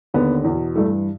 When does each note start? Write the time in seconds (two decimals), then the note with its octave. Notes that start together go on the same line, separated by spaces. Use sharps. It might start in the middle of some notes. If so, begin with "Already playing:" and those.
0.14 D#2 D3 B3
0.44 E2
0.49 B2
0.76 G2 E3 A3